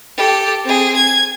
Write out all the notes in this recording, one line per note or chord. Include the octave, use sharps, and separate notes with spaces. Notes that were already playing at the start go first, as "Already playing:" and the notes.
G4 A4
C4 G#4
G#6